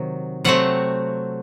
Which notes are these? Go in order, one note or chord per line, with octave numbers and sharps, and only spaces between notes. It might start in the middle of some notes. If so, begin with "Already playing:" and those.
Already playing: C3 D#3 F#3
C3 F#3 A3 C4 F#5